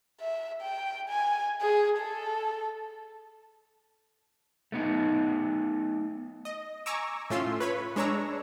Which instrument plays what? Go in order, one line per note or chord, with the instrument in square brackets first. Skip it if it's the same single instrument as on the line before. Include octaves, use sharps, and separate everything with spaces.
[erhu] E5
G5
G#5
G#4
A4
[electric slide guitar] A3 B3 D#4
[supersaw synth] D#5
G#5 A#5 C#6 D6 E6
A2 A3 C#4 F4 C6 E6
B4 C#5 B5
G#3 D4 C#5 A#5 E6